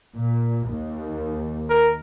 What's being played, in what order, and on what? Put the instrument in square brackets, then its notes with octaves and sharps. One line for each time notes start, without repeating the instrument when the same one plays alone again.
[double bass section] A#2
D#2
[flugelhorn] A#4